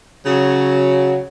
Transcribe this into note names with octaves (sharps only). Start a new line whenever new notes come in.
C#3 F#3